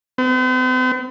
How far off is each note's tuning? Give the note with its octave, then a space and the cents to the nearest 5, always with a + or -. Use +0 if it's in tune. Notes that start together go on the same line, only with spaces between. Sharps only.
C4 -45